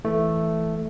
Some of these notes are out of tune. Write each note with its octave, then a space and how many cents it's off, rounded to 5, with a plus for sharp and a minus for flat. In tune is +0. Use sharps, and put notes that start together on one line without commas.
E3 +5 A3 +0